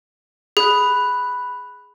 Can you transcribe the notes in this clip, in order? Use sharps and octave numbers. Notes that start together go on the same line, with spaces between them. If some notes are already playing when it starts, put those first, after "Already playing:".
G#4 B5 F#6